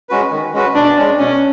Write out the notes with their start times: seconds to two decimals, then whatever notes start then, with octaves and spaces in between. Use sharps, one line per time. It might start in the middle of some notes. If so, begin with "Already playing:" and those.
0.09 G#3 C#4 F#4 B4
0.32 D#3
0.53 G#3 C#4 F#4 B4
0.75 B2 D4
0.97 G#3 C#4
1.19 B2 C#4